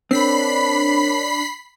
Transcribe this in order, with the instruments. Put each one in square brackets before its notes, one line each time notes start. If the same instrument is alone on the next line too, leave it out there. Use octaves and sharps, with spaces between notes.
[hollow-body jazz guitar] C4 [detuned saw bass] D4 [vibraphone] A#4 C#5 [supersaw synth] B5 B6 C7